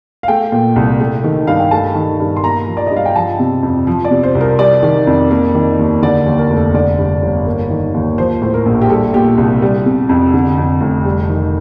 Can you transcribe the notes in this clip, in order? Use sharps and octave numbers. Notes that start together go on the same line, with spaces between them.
F5
A3 G5
A#2
C2
A3
D#3
G2 F5
G5
A3 A5
D#3
G2
C6
A#3 A#5
F3
D5
G2 D#5
F5
G5
F3 A5
C3
F2
F3
D5
C3
C5
C2
A#4
G3 D5
D#3
F2
A#3
D#3
D#2
D3 D5
D#2
A#4
F1
A4
D3 D5
G2
G1
A#3
D#3
D#2
F3 C5
A2 C5
A#4
A#1
G4
G3 A4
A#2 G4
C2
G3
C3
F2
D3
F2
F1
G3
D#3